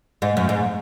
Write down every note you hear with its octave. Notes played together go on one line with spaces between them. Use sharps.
G#2
F#2
G#2